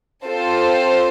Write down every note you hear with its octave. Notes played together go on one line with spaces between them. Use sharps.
C4 F4 A4 C5